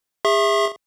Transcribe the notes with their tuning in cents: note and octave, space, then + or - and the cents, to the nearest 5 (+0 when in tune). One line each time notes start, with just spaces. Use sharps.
G#4 -35 E5 +0 C#6 -45